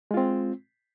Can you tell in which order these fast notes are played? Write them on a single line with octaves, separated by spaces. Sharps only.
G#3 F4 C4